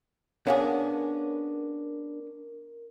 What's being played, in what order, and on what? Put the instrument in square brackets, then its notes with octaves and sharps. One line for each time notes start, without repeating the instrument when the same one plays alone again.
[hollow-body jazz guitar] B3 C#4 G#4 [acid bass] D4 [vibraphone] A#4 [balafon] C#5 F5 F#5